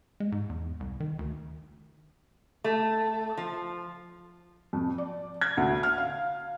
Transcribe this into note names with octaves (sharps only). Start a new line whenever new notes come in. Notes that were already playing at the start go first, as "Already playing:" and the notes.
G#3
G#2
E2
C2
D#3
D2
A3
F3
F2
D5
G#6
D2
F6
F5